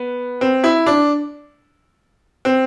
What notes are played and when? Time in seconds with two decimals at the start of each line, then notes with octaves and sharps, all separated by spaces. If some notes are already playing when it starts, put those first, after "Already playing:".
Already playing: B3
0.41 C4
0.64 E4
0.86 D4
2.45 C4